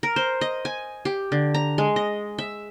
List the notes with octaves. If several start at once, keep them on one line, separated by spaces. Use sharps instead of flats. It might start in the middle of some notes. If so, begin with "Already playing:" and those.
A#4
C5
D#5
G#5
G4
D3
A#5
G#3
D#5
E5